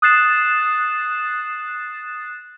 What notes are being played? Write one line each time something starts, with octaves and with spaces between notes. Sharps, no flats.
D#6 F#6 A6 C7 E7